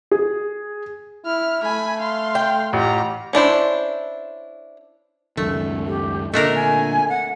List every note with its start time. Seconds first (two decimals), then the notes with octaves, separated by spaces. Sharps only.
0.11 G#4
1.25 E4 F6
1.62 A3 G#5 B5
2.00 F5 C6
2.35 G5
2.73 A1 F4 G4 A#5
3.33 C#4 D4 E4 C5
5.37 C#2 F#2 D#3 A3
5.87 G4
6.34 A#2 D3 A3 D4 A#4 D#5
6.56 G#5
7.09 F#5